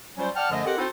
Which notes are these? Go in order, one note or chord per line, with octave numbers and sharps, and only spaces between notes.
F#3 G3 C#4 F4 C5
D5 F#5 G5 A5 F6
F#2 D3 F3 A3 D#5
C4 G4 A4 A#4 D#5 F#5
C4 D#4 E4 F#4 A4 C5